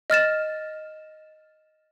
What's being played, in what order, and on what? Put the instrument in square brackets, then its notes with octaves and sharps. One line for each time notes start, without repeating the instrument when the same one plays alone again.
[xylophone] D#5 F6 A6 E7